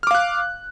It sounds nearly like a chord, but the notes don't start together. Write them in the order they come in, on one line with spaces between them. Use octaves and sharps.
F6 D6 F5 F#6